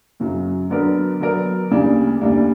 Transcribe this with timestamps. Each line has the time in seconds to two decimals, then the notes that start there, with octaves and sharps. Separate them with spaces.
0.20 F#2 C#3 F#3
0.70 D3 F#3 B3 D4 A#4
1.20 D3 F#3 B3 D4 A#4
1.70 D2 C#3 G3 A#3 D4
2.21 D2 C#3 G3 A#3 D4